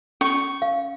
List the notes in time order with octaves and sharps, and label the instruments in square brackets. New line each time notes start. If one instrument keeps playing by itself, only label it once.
[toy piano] C#4 [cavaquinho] C#6
[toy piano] F5